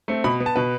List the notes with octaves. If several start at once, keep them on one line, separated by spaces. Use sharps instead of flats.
A3 C4
B2 B5
B3
A5
B2 B4